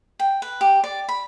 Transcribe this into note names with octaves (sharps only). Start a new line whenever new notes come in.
G5
B4
G4
D5
B5